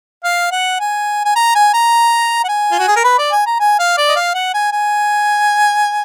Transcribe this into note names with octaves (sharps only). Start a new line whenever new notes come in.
F5
F#5
G#5
G#5
A#5
G#5
A#5
F#5
G#5
F4
F#4
G#4
A#4
B4
D5
G#5
A#5
G#5
F5
D5
D#5
F5
F#5
G#5
G#5